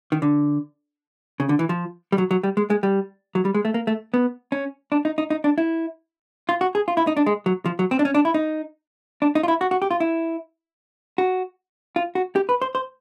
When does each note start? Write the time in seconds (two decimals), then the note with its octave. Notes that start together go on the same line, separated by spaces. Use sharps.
0.12 D#3
0.22 D3
1.40 C#3
1.49 D3
1.59 E3
1.69 F3
2.12 G3
2.18 F#3
2.31 F#3
2.43 G3
2.57 G#3
2.70 G#3
2.83 G3
3.35 F#3
3.45 G3
3.54 G#3
3.65 A3
3.74 A#3
3.87 A3
4.14 B3
4.52 C#4
4.92 D4
5.05 D#4
5.18 D#4
5.30 D#4
5.44 D4
5.58 E4
6.49 F4
6.61 F#4
6.75 G#4
6.88 F4
6.97 E4
7.07 D#4
7.17 D4
7.26 G#3
7.46 F#3
7.66 F3
7.79 F#3
7.91 C4
7.99 D4
8.05 C#4
8.14 D4
8.25 E4
8.34 D#4
9.22 D4
9.35 D#4
9.43 F4
9.48 E4
9.61 F#4
9.71 F#4
9.82 G4
9.91 F4
10.00 E4
11.18 F#4
11.96 F4
12.15 F#4
12.36 G4
12.49 B4
12.62 C5
12.75 C5